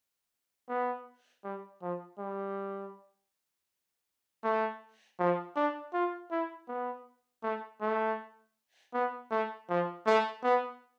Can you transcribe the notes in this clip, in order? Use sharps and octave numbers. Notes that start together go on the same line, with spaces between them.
B3
G3
F3
G3
A3
F3
D4
F4
E4
B3
A3
A3
B3
A3
F3
A3
B3